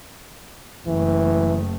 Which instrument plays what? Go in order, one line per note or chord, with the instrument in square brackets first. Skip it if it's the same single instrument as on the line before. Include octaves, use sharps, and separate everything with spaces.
[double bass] F#1 A3 [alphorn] E3